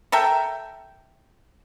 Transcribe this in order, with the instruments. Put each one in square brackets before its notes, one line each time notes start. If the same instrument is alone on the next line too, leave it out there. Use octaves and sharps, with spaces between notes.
[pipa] A4 A#4 E5 G5